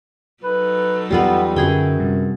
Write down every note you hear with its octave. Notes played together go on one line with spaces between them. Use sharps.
F#3 D#4 A4 B4
E2 G3 G#3 B3 F4 B4
F#2 D3 F#4 G#4 G5
C3 G3